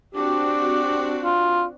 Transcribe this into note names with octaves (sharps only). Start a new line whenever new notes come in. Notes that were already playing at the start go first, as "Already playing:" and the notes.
C4 D4 F#4 G4
F4